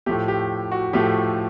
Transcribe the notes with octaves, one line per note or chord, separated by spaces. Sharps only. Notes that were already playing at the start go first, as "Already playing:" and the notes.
A2 F3 A3 G4
G4
F#4
A2 F3 A3 G4